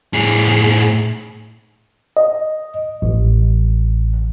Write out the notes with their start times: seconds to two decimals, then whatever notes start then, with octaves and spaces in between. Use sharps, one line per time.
0.13 A2 G#4
2.17 D#5
3.02 A1